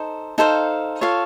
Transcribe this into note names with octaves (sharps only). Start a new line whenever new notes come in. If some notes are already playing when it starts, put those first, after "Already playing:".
Already playing: D#4 A4 C5
D#4 A4 C5 F5
F4 A4 C#5 F5